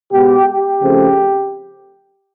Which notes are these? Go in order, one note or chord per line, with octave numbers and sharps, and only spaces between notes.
B2 G#3 B3 G4
G4
C#3 F3 A3 C4